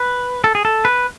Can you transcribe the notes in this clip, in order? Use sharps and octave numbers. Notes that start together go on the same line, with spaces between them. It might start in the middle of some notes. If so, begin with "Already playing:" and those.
Already playing: B4
A4
G#4
A4
B4